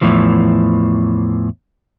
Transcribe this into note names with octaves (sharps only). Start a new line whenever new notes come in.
E2 A2 E3 F3